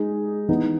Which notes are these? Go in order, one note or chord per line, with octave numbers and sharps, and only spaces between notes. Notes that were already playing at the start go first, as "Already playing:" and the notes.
Already playing: G#3 D#4 G#4
E3 B3 D#4